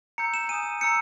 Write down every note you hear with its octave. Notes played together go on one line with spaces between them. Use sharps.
A#5 E6 G6 C#7
E7
G#5 D#6 G6 D#7
A#5 E6 G6 C#7